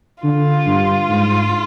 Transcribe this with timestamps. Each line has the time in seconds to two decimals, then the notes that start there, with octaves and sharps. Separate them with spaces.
0.23 D3 F4
0.66 G2
1.09 G#2